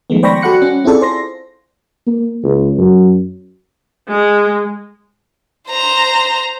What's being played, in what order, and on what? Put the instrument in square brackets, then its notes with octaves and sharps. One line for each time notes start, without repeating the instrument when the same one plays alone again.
[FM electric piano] D#3 F3 G#3 A3 B3
C5 D5 G5 B5 C#6 A#6
G3 F#4 A4 F#5 F#6 C#7
C#4
C4 E4 F4 G#4 A4 D5
C5 C6 A#6
[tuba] A#3
C#2
F#2
[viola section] G#3
[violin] C5 A#5